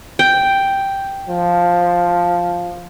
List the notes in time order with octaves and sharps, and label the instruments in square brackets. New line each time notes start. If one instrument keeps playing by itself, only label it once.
[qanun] G5
[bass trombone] F3